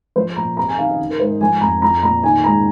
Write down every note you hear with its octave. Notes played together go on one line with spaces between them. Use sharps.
F3 C5
A#2 A#5
C3 A#5
G#5
D#3 F5
D#5
D#3
A#4
G#2 C5
D#5
F3 G#5
F2 A#5
F3 A#5
A#2 A#5
D#3 G#5
G#2 A#5